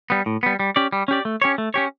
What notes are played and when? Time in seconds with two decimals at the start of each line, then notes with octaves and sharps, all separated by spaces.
0.10 G3 B3
0.26 A2
0.43 G3 B3
0.60 G3
0.76 C#4 G4 D5
0.93 G3
1.08 C#4 G4 D5
1.25 A3
1.42 C#4 G4 C#5
1.58 A3
1.74 C#4 G4 C#5